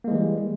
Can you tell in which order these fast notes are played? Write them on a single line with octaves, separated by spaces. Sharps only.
A#3 G#3 E3 G3